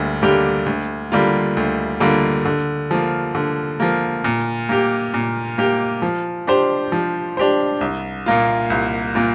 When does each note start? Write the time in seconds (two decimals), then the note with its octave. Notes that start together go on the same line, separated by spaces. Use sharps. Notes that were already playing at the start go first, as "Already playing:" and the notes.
Already playing: D2 D3 G3 A#3
0.22 D3 G3 A#3 G4
0.66 D2
1.12 D3 G3 A#3 F4
1.57 D2
2.00 D3 G3 A#3 F4
2.45 D3
2.91 F3 A#3
3.35 D3
3.80 F3 A#3
4.24 A#2
4.69 A#3 G4
5.14 A#2
5.58 A#3 G4
6.02 F3
6.47 D4 G4 C5
6.92 F3
7.37 D4 G4 C5
7.81 C2
8.26 A#2 A#3 F4
8.70 C2
9.15 A#2 A#3 F4